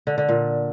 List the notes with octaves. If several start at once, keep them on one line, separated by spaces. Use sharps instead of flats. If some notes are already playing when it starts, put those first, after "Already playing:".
D3
D3
A#2